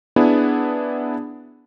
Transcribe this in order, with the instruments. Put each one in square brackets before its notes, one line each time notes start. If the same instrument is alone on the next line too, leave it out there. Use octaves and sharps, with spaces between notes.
[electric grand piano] B3 D4 E4 G#4